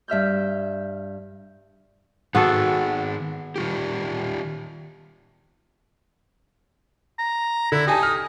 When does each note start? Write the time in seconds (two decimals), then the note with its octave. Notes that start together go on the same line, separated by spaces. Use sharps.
0.08 G2 E5 F6 G6
2.35 D#3 B3 F#4 G#4 A4
3.56 D#3 F4 G4
7.19 A#5
7.72 D3 E4
7.87 D#4 G4 G#5 A5
8.03 F6